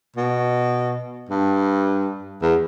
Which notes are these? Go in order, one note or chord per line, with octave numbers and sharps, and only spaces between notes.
B2
G2
E2